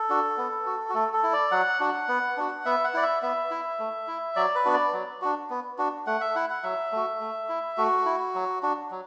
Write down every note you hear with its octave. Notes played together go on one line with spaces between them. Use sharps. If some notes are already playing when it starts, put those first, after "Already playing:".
Already playing: A4
D4 F#4
B3
F#4
F#4
A3 A4
A4
E4
D5
F#3 F#5
D4 F#4
B3
D4 F#4
B3 E5
F#5
E4 D5
E5
B3 E5
E4
A3
E4
F#3 D5
B4
B3 D4 F#4
D5
F#3
D4 F#4
B3
D4 F#4
A3 F#5
E5
E4 F#5
F#5
F#3 E5
A3 F#4
A3
E4
A3 F#4
E4
F#3
D4 F#4
F#3